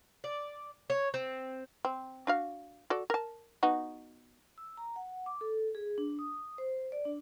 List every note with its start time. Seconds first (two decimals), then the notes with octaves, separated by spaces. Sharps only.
0.24 D5
0.90 C#5
1.14 C4
1.85 C4
2.27 D4 F#4 F5
2.90 F#4 A4 D5
3.10 A#4 A5
3.63 B3 D#4 F#4
4.58 E6
4.77 A#5
4.96 F#5
5.26 D6
5.41 A4
5.75 G#4
5.98 D4
6.19 D#6
6.58 C5
6.92 D5
7.05 D4